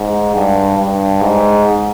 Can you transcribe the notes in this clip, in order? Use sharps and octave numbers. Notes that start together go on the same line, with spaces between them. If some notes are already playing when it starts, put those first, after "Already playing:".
Already playing: G#2
G2
G2
G#2